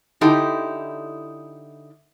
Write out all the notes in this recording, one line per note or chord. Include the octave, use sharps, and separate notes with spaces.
D3 D#4 E4 G4 A4